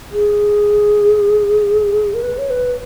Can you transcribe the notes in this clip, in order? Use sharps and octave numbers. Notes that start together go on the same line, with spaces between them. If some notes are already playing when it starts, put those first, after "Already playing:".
G#4
A#4
B4
C#5
B4